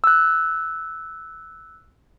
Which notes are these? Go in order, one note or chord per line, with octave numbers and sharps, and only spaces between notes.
E6 F#6